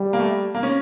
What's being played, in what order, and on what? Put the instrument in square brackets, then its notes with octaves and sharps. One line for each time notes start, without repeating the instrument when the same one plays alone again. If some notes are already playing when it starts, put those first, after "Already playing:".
Already playing: [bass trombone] G3
[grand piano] A#3
A3
A#3
C#4